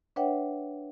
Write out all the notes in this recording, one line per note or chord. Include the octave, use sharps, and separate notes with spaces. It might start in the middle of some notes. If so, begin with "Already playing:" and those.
D4 B4 C#5 E5 F#5 G5